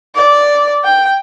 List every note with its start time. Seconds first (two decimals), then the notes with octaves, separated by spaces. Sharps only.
0.15 D5
0.84 G5